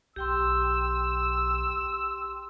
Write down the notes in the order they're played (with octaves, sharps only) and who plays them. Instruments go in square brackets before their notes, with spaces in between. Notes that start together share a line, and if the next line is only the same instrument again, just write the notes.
[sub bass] B1 [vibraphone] G4 G5 C6 [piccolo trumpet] E6